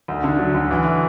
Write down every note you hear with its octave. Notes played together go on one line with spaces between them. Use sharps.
D2
D3
F#3
D2
E3